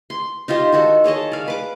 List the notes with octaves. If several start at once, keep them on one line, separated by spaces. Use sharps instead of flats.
C6
D#4 F4 G4 C5
D#3 F#4 A4
G#4 C#5 D#5 A5
D5 F5
B4 D6